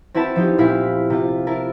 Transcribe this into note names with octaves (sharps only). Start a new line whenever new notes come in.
C4 E4 F#4 B4 A5 B5
F3 D#4 G4
A#2 C4 E4 F5 B6
C3 F4
E4 A#4 A5